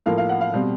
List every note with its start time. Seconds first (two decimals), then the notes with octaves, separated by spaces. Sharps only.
0.06 A2 F3 A#3 F5
0.18 F5
0.29 F#5
0.41 F5
0.53 B2 G3 C4